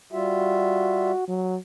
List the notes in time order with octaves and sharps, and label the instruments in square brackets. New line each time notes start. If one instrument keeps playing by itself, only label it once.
[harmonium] G3 F4 E5 [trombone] F#4
[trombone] F#3